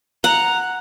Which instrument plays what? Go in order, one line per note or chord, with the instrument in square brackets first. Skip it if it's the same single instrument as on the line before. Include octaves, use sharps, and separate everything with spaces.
[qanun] F#5 [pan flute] A#5